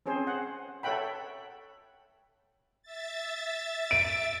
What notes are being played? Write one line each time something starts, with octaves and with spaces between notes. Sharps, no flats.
C4 C#4 G#4 C5
F#5
A4 C#5 E5 F#5 G5 B5
E5 A6
D7